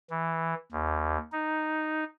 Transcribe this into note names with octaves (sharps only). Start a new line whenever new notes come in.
E3
D#2
D#4